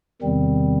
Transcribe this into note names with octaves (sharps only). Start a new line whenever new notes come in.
E2 C3 D#3 G3 C4